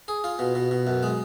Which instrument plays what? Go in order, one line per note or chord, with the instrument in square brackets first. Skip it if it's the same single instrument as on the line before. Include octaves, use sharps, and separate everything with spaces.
[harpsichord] G#4
F4
B2
B2
B2
F#2
G#3